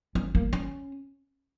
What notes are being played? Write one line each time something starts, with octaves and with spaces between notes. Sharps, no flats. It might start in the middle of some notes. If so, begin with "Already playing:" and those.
C#4
A#3
C#4